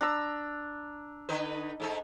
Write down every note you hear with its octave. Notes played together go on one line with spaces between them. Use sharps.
D4 A#5 E6
D3 D#4 B4
G#2 A3 D#4